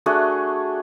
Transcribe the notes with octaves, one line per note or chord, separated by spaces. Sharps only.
A3 D4 F#4 G#4